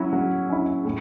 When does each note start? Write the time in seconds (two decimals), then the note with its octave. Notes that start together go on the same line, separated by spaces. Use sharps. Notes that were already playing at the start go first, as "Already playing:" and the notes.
Already playing: F#3 C#4 E4
0.13 F#3
0.50 C#4 E4
0.85 A2